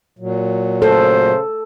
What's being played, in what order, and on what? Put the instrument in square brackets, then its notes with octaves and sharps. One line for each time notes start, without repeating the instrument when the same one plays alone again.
[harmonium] A#2 F#3
[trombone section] C#3 A3 C5 [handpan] A4